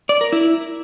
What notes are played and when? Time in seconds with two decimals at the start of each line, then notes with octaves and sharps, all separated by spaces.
0.09 D5
0.21 A#4
0.32 E4